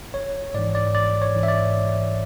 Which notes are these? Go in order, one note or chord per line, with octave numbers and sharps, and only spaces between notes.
G#1 C#5
G#2 E3 D5
D5
G#1 D5
C#5
G#2 E3
E5
D5